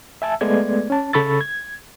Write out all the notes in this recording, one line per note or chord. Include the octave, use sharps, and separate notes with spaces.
E5 G#5 A5 E6
G#3 A3 B3 D5 G#6
C#4 A5
C#3 A4 B5 C#6 E6 A6
G#6